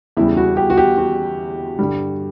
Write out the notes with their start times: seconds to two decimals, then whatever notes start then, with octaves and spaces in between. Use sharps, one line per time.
0.17 E2 C#3 G3 E4
0.37 F#4
0.57 G4
0.70 F#4
0.78 G4
0.98 F#4
1.79 G2 D3 G3